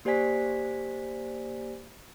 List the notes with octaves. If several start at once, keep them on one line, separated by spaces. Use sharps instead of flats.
A#3 G4 C5 D5 G#5 B6